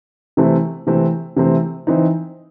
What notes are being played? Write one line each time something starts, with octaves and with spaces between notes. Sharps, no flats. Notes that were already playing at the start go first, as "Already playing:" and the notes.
C3 E3 A3 C4
C3 E3 A3 C4
C3 E3 A3 C4
E3 C4 D#4